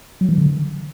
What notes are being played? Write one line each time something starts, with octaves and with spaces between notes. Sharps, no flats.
F#3
E3
D3